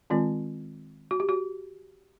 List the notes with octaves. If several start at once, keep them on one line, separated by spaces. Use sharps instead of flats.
D#3 G#3 C4 F4
F#4
G4
F#4